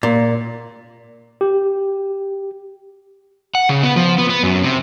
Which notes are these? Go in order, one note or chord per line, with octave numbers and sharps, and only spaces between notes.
A#2
G4
F#5
C#3
B3
F3
B3
B3
F#2
C3